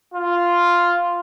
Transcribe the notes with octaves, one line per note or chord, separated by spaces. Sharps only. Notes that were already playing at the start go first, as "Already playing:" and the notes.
F4